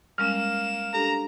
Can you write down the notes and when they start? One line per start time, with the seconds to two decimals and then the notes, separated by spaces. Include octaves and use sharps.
0.18 G3 G#3 A#3 C#4 F6 E7
0.94 D4 G4 A4 A#5